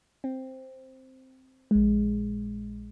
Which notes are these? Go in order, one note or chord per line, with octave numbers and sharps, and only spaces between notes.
C4
A#1 G#3